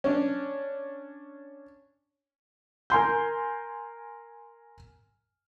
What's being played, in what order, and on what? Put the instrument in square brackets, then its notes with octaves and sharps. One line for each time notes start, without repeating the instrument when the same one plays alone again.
[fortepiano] C#4 D4
[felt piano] A#4 G#5 C6 G6